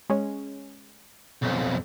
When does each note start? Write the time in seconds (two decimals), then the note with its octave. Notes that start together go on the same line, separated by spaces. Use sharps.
0.10 G#3 C#4
1.43 B1 F2